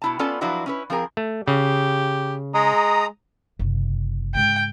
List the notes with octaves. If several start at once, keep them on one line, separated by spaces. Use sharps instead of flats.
B2 E4 A5
B3 C#4 F4 A4 D5 A5
F3 F#3 D4 E4 F#4 B4
C#4 E4 B4
F3 C4 G#4 A#4
A3
C#3 G4
G#3 A#5 D#6
F#1 C3
G#2 C#3 G5